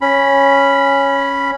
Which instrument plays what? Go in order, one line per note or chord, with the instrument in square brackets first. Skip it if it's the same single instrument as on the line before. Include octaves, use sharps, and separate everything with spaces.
[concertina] C#4 B5